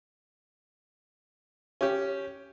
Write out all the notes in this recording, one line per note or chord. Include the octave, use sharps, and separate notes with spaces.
C#4 G4